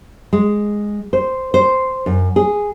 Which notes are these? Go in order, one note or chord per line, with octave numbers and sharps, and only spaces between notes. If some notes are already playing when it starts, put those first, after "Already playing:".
G#3
C5
C5
F#2
G#4